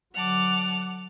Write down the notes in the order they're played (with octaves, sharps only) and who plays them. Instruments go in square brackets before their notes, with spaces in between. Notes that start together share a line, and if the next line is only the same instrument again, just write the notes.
[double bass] D3 F#3 [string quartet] F#5 A5 D6 [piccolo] F7